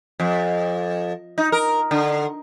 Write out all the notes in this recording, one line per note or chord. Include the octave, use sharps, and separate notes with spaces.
F2
D#4
A#4
D3